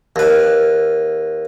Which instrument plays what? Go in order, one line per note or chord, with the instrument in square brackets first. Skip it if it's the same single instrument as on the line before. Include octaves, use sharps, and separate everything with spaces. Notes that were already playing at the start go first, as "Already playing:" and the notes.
[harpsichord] D#2 B4